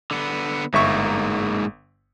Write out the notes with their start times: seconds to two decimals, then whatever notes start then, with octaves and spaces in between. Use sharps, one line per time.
0.11 D3 B3
0.73 G1 G#2 A#3 E5 C#6